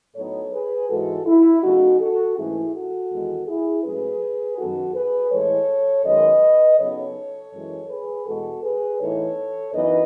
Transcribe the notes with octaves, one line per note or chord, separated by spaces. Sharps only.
A2 F#3 B3 D#4 A4 C#5
G#4 B4
G#2 E3 G#3 F#4 A4
E4
C#3 F#3 A3 D#4 F#4
F#4 A4
G#2 E3 A3 C#4 E4 G#4
F#4 A4
E2 D#3 G#3
E4 G#4
G#2 F#3 A3 C#4 G#4 B4
F#2 D#3 F#3 B3 D#4 F#4 A4
G#4 B4
A2 E3 G#3 A4 C#5
F#2 D#3 G#3 B4 D#5
C#3 F#3 B3 D#4 A4 C#5
F#2 E3 G#3
G#4 B4
E2 B2 G#3 F#4 A4
G#4 B4
A2 E3 B3 D#4 A4 C#5
F#2 E3 B3 D#4 B4 D#5